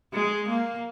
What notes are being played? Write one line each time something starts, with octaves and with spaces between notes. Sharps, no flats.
G#3
A#3